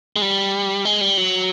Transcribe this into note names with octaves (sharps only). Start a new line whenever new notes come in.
G#3
G3
G#3
G3
F#3